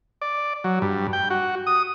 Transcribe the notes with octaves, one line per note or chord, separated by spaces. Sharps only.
D5
F#3
G2
G5
F#4
D#6